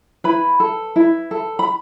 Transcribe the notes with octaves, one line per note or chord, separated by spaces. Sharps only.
E4 B4 B5
A4
E4
A4
B5